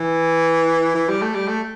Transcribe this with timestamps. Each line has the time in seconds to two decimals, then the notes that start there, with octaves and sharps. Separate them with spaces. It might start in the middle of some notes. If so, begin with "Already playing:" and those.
Already playing: E3
0.95 E3
1.09 G3
1.22 A3
1.35 G3
1.48 A3